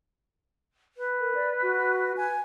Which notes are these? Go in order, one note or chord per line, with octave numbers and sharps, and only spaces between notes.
B4
A#4
D5
F#4
G#5